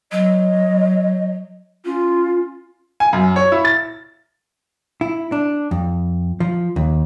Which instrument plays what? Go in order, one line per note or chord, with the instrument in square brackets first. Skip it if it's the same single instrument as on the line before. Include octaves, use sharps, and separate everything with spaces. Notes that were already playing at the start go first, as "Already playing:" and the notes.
[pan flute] F#3 [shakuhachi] D#5
[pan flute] C#4 [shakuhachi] F4
[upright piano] G#5
F#2
C#5
E4
A6
[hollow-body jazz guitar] E4
D4
F2
F3
D#2